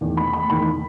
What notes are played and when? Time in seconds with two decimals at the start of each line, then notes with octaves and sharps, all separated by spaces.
0.01 E2 D#3
0.17 B5
0.33 B5
0.49 E2 D#3 B5